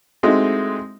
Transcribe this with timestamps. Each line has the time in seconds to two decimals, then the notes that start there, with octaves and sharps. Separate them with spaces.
0.23 G#3 A3 C4 D#4 E4 F#4